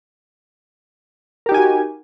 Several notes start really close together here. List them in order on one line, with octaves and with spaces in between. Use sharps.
A#4 G4 D#4 G#5 F#4